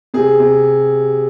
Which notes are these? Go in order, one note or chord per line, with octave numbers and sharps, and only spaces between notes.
C3 G#4
C3